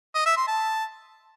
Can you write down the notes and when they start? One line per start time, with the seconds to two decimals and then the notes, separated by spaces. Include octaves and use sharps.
0.15 D#5
0.26 E5
0.37 C6
0.48 A5